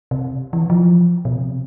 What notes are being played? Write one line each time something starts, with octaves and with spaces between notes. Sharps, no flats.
C3
E3
F3
B2
C3